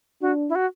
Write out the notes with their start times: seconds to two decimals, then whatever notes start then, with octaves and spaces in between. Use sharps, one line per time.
0.21 D4 F#4
0.49 E4
0.55 F#4